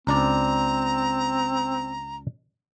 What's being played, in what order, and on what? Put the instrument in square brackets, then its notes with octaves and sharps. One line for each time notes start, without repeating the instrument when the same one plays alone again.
[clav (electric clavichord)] C#2 D4 D5 [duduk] C4 [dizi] A#5